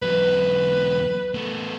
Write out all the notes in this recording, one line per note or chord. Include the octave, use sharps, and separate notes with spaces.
E2 F#3 B4
A3 B3